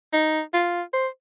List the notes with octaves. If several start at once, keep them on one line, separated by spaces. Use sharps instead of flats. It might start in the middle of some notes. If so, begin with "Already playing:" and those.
D#4
F4
C5